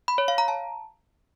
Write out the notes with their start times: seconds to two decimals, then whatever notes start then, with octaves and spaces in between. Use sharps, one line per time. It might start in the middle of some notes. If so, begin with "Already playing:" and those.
0.08 B5
0.18 C#5
0.28 F5
0.38 A#5
0.48 A5